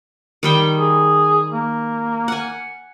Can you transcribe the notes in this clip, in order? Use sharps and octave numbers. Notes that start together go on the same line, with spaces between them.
D#3 G3 G5
G#4
A#3
F#5 G#5